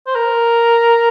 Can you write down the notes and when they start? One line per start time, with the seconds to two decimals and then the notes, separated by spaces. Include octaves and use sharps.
0.07 C5
0.16 A#4